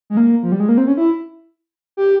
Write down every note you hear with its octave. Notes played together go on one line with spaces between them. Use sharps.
G#3
A#3
F3
G3
G#3
A#3
C4
C#4
E4
G4